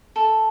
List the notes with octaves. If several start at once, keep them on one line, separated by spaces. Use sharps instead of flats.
A4